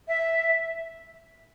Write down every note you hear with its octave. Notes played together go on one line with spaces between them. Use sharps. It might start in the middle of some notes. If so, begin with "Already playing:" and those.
E5